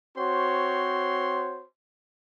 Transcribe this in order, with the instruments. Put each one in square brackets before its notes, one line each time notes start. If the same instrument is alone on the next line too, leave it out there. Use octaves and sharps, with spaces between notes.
[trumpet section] C4 F#4 C5 C#5 C6